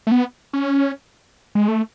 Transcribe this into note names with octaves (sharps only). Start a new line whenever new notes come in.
A3
B3
C#4
G#3
A3